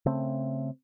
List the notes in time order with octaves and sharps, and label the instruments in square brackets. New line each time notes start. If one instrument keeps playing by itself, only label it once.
[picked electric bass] C#3 A3 C4